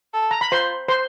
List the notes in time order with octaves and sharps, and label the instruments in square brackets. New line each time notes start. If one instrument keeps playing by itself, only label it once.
[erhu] A4
[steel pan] A#5
B5
[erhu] F4 [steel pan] C5 C6
[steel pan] C5 C6